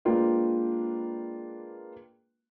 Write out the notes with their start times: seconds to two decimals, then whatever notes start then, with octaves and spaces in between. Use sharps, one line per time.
0.05 G#3 A#3 D4 F4 B4 G5